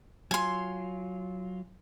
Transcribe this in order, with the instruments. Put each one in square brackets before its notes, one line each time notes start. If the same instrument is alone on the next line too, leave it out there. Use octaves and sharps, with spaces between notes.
[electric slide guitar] F#3 F4 [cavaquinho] G#5 C6